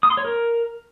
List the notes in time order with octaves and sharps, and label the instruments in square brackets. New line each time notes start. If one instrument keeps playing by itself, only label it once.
[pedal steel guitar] D#6
C6
C#5
A#4